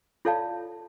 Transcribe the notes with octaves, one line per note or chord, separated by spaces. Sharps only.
F4 A4 C#5 D5 F5 A5